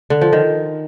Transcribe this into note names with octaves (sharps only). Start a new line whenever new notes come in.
D3
F3
D#3